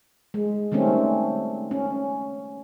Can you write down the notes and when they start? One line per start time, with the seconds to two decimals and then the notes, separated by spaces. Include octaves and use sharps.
0.34 G#3
0.72 D#3 G3 A3 C4 C#4
1.71 C#4